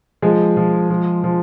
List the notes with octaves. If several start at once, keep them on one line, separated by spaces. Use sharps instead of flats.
F3 G#3
F3
F3
F3